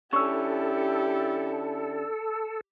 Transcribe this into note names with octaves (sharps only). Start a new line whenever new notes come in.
D3 C#4 E4 G4 A4 C#6 E6